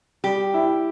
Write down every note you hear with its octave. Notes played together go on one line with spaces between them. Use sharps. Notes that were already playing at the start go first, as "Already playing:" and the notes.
G3 G4
E4